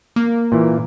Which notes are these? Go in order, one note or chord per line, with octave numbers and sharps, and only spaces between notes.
A#3
A#2 E3